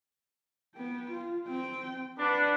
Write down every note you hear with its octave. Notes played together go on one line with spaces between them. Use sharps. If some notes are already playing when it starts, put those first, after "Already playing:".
B3 G5
F4
C4 G5
D4 B4 F#5